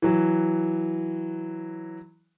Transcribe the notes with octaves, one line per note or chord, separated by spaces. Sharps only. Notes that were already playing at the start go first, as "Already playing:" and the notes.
E3 F#3